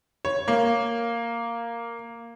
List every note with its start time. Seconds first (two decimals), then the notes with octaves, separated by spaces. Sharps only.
0.25 C#5
0.48 A#3